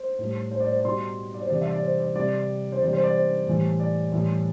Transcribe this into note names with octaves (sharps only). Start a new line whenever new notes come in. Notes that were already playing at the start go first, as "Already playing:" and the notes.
Already playing: C5
A2 G3
C5
D5
C5
D5
B2 G3 C6
D5
C5
C3 E3 G3 D5
E5
D5
C5
D5
C3 G3 D5
C5
C3 E3 G3 D5
C5
D5
C5
A2 E3 G3
D5
A2 E3 G3